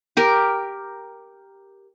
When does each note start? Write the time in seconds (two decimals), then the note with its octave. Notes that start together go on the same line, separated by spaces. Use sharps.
0.17 G4 A#4